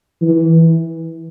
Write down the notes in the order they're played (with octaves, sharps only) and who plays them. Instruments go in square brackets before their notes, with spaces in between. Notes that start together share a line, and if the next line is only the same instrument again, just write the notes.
[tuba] E3